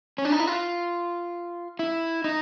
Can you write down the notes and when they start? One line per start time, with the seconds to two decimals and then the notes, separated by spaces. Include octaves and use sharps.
0.18 C#4
0.25 D4
0.32 D#4
0.40 E4
0.47 F4
1.79 E4
2.24 D#4